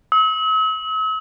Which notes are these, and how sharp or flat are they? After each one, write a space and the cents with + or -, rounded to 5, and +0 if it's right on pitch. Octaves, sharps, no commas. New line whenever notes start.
E6 -45